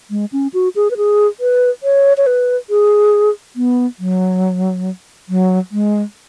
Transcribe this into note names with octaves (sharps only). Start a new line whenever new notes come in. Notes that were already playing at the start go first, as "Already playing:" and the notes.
G#3
C#4
F#4
G#4
B4
G#4
B4
C#5
C#5
B4
G#4
B3
F#3
F#3
G#3